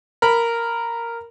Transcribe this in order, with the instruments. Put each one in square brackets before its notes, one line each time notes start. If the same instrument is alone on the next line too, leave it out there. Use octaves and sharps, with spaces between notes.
[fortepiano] A#4 B5